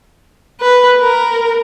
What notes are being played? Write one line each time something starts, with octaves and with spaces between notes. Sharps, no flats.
B4
A#4